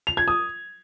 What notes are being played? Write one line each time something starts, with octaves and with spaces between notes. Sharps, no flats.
F7
G#6
D#6